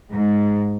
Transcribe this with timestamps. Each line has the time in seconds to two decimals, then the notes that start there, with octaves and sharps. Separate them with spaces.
0.13 G#2